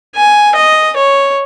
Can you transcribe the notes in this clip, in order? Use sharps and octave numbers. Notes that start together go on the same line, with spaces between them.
G#5
D#5
C#5